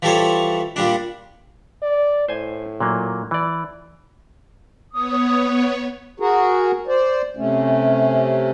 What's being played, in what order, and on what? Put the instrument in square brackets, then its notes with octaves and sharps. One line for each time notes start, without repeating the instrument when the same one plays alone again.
[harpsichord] E3 F3 G3 A4 C5 C#5
A#2 G3 D4
[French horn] D5
[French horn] A2 [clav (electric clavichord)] C5 G#5
[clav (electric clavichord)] A#2 F#3 A#3
E3 D5
[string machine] B3 C#5 [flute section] D#6
[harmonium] F#4 G#4 A#4
C5 D5
C3 A3 C#4